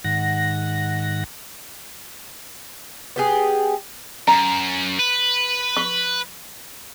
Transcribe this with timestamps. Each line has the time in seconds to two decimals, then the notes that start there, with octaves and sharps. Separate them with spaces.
0.04 G#2 D#3 F#5 A#6
3.16 B3 G4 G#4
4.28 F#2 A#5
4.99 B4
5.77 C#6